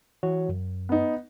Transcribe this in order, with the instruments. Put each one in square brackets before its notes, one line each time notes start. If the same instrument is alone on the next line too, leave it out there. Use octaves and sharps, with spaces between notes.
[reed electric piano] E3 F#4 C#5
F#2
[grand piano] B3 D#4